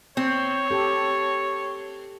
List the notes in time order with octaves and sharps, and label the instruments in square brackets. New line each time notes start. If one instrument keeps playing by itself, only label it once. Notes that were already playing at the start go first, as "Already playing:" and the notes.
[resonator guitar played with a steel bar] C4 [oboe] C#5
[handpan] G4 A4